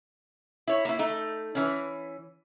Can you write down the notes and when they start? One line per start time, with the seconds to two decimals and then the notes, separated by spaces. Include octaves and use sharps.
0.68 E4 C#5
0.85 A#3 E4
0.99 A3 D#4
1.55 E3 C#4